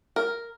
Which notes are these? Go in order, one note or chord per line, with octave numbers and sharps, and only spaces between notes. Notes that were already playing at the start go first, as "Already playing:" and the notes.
A#4